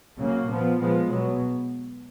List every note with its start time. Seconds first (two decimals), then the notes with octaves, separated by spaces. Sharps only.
0.18 C#3 F#3 A#3
0.48 A#2 F3 B3
0.78 A#2 F3 G#3 B3
1.08 B2 F#3 B3